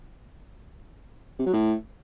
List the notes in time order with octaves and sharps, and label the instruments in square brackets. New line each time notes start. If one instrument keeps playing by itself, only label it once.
[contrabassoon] C3
F#3
A2